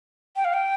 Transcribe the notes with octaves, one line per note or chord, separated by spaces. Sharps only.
G5
F5
G5